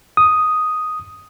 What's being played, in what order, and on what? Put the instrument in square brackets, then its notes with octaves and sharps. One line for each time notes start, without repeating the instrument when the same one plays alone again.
[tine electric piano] D#6